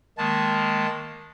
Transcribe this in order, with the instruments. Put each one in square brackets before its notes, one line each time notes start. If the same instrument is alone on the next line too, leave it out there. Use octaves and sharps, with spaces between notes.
[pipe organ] D#3 G#3 A#3 [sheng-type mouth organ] A5